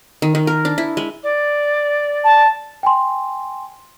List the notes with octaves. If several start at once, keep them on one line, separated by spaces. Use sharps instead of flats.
D#3
D#3
A#4
D4
E4
G#3
D5
A5
G5 G#5 C6